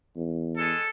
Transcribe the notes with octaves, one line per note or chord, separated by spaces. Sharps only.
E2
G#3 A4